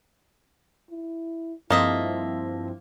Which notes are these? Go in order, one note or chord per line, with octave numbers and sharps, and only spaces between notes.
E4
G2 F3 A#3 C4 E4 A4 D#5 E5